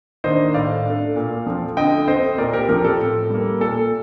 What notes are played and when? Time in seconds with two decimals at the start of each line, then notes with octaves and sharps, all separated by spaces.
0.24 D#3 A#3 D4 C5 D#5
0.54 A2 D5 F5
0.85 A3 D4
1.16 A#2
1.47 F3 A3 C4
1.77 D3 D#5 G5
2.08 A3 C4 C5 D#5
2.38 A#2 A#4 D5
2.53 G4 A#4
2.69 F3 A3 C4 G4 A#4
2.84 A4
3.00 A2
3.30 G3 A#3
3.60 A#2 A4